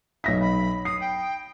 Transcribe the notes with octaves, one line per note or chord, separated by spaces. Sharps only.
B1 E5 A#6 B6
B5
D#6 C7
G5